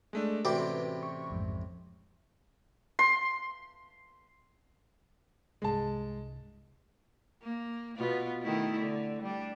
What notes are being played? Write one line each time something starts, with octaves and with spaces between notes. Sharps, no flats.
G#3 A3 D4
A1 C3 F#4 B4 D5 G5 B5
C#6
A#1 F2 G#2
C6
C2 G2 G#3 A5
A#3
B2 B3 F4
D#3 A3 E4
D3
G3 D4